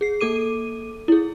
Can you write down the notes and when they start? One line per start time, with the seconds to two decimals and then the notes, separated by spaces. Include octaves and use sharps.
0.01 G#4 C7
0.21 A#3 A4 D6 D#7
1.08 E4 G#4